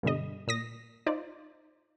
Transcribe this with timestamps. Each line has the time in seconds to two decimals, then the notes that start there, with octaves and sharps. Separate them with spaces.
0.03 G2 B2 D3 G3 D#5
0.47 A#2 D#6 A#6
1.06 D#4 F4 C5 D5